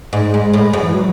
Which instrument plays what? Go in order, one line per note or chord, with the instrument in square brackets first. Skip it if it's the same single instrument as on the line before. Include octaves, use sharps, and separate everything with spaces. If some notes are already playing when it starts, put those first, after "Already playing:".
[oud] G#2 [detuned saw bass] G#3
[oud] G#2
A2
F#2
[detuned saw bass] E3
F#3